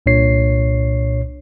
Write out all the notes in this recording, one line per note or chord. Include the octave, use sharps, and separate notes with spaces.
C2 A#2 D4 C#5 C7